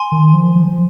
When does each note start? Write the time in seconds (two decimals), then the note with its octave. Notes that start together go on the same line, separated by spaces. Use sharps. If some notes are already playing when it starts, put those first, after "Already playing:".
Already playing: G#5 C6
0.12 D#3
0.33 F3
0.56 F3
0.67 F3